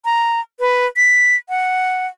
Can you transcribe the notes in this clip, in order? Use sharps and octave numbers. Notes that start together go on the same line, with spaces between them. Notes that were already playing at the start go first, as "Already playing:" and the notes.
A#5
B4
B6
F#5